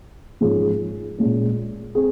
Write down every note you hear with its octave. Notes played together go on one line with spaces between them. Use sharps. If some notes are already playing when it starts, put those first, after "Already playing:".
G#2 F3 G#3 C#4 G#4
A#2 G#3 C#4
C4 G#4